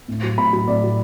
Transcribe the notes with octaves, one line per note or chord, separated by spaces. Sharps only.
A2
F#3
A2 B5
F#3
A2 D5
F#3